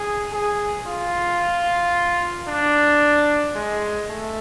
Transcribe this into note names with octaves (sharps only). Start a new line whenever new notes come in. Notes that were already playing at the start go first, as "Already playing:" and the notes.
Already playing: G#4
G#4
F4
D4
G#3
A3